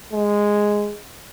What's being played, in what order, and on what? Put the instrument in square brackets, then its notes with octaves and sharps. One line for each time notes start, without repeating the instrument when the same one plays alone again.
[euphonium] G#3